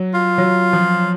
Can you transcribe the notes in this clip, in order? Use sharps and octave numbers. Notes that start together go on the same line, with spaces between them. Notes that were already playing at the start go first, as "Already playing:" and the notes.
Already playing: F#3
F4
F#3
F3